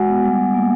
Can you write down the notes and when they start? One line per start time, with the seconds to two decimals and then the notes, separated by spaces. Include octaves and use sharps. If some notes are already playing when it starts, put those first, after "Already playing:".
Already playing: G#3 F#4 F#5 G#5
0.09 B3
0.23 G3
0.39 G3
0.55 A#3